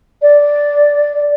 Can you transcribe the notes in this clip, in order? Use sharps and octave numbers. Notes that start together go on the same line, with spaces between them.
D5